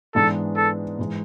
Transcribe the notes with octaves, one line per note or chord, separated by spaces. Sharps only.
G#2 E3 G#3 B3 D4 A4
A4
G#2 E3 G#3